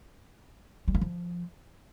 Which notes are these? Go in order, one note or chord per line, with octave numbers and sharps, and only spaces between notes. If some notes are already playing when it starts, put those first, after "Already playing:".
G3
A#3
F3